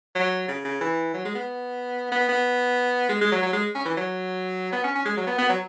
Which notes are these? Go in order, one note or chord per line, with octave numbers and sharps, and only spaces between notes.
F#3
C#3
C#3
E3
F#3
G#3
B3
B3
B3
G#3
G#3
F#3
F#3
G#3
C#4
E3
F#3
B3
C#4
C#4
G#3
F#3
B3
B3
F#3